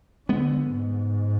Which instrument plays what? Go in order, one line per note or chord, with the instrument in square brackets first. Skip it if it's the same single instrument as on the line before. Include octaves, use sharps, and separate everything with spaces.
[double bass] D3 [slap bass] G#3 B3
[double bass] G#2